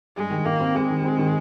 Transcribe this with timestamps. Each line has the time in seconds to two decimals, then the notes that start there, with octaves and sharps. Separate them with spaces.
0.16 G2 G#3
0.30 D#3
0.45 D#3 A#3
0.60 C4
0.74 G#3 C4
0.90 D#3
1.04 C4
1.19 D#3